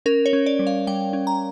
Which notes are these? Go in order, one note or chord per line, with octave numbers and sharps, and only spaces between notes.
C#4 A#4
C#5
C#4
D5
G3
F5
G3 G5
C#4
A#5